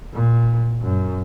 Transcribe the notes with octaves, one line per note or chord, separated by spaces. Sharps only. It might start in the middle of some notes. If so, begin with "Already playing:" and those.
A#2
F#2